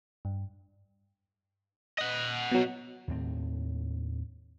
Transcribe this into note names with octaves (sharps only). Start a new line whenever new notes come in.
G2
D#5 F#5
B2 F#3
D#2 A2 C4